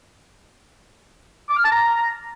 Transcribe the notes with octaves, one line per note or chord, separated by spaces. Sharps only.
D6
F6
A5
A#5